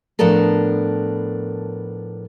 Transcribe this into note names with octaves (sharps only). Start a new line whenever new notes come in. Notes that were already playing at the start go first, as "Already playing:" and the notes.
A2 F3 B3 D4 A4 A#4